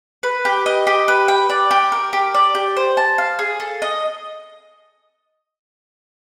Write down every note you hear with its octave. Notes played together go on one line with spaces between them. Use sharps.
B4
G4
D#5
G4
B4
G5
D5
G4
A#4
G4
D5
G4
C5
A5
F5
G#4
A4
D#5